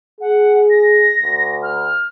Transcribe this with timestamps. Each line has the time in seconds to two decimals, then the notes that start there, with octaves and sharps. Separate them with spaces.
0.21 G#4 F#5
0.70 A#6
1.22 D2
1.63 F6